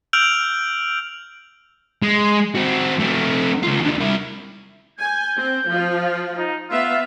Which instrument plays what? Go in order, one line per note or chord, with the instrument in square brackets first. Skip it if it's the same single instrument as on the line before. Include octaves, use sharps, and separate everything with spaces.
[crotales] E6 F6 G6 D7 F7 F#7
[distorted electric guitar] G#3
C4 F#4
A3 C4
C#2 F4
D#2 D3
C2 E4
[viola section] G#5 [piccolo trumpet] G6
[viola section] C4
F3 F4
[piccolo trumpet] D#4
[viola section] B3 E5 [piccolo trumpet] F4